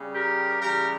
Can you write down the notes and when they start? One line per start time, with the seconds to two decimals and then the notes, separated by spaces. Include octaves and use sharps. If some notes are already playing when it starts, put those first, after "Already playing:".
Already playing: C#3 G3
0.13 G4 A#4
0.60 C#3 E3 G3 G4 A#4